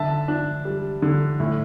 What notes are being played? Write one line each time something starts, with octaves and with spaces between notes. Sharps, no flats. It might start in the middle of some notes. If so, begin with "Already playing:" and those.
Already playing: D3 E5 A5
D4
G3
D3
A2